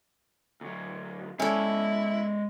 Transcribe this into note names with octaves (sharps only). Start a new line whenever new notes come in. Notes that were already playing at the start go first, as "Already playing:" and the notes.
D2 F#3
G#3 C#4 E4 A4 D5